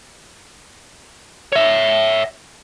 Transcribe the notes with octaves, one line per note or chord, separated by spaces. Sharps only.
C#5 E5